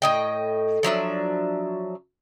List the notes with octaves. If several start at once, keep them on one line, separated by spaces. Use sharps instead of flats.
A2 D#5 G5
F3 F#3 D4 E5